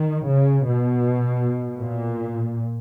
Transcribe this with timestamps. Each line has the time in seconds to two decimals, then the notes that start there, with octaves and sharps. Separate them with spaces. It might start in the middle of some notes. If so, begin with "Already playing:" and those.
Already playing: D#3
0.27 C#3
0.65 B2
1.80 A#2